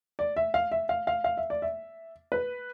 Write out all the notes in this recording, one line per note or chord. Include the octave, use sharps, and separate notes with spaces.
D5
E5
F5
E5
F5
F5
F5
E5
D5
E5
B4